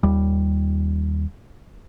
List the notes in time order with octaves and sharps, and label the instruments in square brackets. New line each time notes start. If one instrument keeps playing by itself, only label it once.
[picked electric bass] D#2 G3